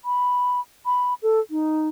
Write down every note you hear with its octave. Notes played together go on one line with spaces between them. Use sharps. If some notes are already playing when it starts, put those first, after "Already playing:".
B5
B5
A4
D#4